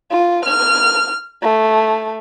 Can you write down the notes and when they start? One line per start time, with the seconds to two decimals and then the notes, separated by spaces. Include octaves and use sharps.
0.11 F4
0.45 F6
1.42 A3